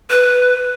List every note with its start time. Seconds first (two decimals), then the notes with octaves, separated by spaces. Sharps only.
0.10 B4